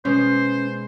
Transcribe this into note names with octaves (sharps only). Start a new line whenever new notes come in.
B2 G#3 B3 C#4 C5